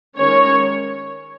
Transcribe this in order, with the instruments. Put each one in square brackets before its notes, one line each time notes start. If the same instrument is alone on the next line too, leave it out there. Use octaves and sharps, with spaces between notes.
[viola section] D#3 G#3 C#4 C#5